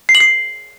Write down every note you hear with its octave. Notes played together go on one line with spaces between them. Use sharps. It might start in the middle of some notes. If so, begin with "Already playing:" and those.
C7
F#7
C7